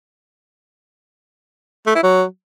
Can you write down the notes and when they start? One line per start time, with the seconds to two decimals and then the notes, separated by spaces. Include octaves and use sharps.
1.87 A3
1.95 E4
2.03 F#3